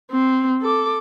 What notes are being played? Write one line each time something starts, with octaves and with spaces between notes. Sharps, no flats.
C4
A4 D6